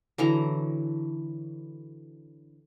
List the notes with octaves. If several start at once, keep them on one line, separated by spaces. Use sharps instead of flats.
D3 E3 F#3 A#5